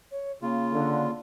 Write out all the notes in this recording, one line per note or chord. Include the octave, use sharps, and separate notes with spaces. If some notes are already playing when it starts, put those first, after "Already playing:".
C#5
C#3 A#3 F4
D3